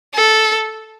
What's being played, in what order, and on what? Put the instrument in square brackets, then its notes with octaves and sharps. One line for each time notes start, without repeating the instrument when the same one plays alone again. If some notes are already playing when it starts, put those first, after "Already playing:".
[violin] A4